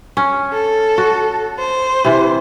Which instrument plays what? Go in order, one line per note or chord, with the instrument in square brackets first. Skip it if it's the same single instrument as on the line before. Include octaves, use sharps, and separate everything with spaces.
[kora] C#4
[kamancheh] A4
[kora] F#4
[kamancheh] C5
[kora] C3 E3